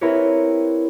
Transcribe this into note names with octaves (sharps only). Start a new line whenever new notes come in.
C4 E4 G4 A#4 B4 C#5